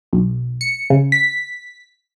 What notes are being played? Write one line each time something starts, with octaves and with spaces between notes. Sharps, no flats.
B1
C#7
C#3
B6